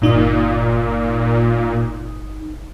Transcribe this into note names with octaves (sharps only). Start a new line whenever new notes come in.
G1 A#2 D#4 D#6